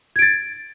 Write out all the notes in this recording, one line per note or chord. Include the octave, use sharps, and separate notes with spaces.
G#6 A6 D7